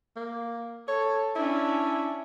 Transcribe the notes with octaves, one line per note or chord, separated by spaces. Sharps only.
A#3
A4 C#5
C#4 D4 E4